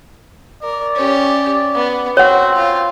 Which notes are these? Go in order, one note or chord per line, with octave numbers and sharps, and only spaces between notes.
A#4 D5
C#4 G4
B3
C4 F#4 C#5 F#5
F4